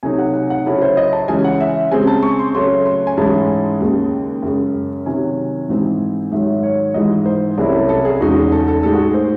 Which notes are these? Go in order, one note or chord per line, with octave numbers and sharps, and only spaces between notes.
C3 F#3 A3 D#4 G#5
F#5
F#5
F#5
C#3 F#3 C#4 E4 A4
C5
D#5
A5
C#3 E3 G#3 C#4 G#5
F#5
E5
C#3 G#3 C4 G#5
A5
C#6
C6
C#3 F#3 A3 C6
C6
G#5
G#2 E3 G#3 C#4 E4 A5
D#2 C#3 G#3
F#2 C#3 G#3
C3 D#3 F#3 G#5
G#2 E3 C4 D#4
G#2 D#3 F#3 E5
C#5
G#2 E3 G#3 D#4 D#5
C5
C2 C3 F#3 C#4 E4 G#4
A4
A4
G#4
E2 C#3 G#3 D#4 F#4
G#4
A4
A4
A2 G#3 D#4 A4
F#4
G#4
C5